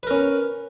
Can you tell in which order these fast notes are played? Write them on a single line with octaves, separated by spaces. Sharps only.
B4 A#4 C#4